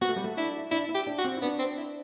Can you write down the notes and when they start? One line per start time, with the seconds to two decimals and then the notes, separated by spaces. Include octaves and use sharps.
0.02 B3 F#4
0.09 A3
0.16 G3
0.24 A3
0.37 D4 E4
0.71 D4 E4
0.89 E4
0.95 G4
1.07 D4
1.18 F#4
1.25 C4
1.37 E4
1.42 B3 D4
1.59 C4
1.78 E4